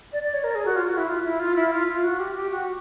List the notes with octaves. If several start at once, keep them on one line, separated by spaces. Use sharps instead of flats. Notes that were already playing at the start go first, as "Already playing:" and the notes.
D5
D5
C#5
A#4
G#4
F#4
F4
F#4
E4
F4
E4
F4
E4
F4
F4
F#4
G4
G4
F#4